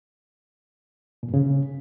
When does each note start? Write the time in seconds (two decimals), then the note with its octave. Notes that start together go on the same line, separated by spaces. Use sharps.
1.23 A#2
1.28 G2
1.34 C#3